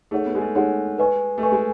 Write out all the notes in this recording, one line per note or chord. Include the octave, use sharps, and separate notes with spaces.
A3 D#4 G#4 C#5 F#5
B3
G#3
A3
G#3 D#4 G#4 C#5 F#5
B4 D#5 G#5 C#6
A3
B4 D#5 G#5 C#6
G#3